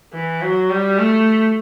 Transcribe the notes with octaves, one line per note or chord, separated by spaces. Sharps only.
E3
F#3
G3
A3